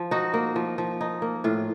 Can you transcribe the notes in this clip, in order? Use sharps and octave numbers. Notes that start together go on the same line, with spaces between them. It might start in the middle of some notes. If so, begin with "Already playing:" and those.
Already playing: F3
D#4 F#4
A#3
F3
F3
D#4
A#3
A2 F4